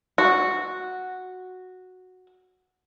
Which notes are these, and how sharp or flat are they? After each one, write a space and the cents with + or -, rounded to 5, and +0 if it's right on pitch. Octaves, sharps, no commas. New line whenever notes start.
F#4 -5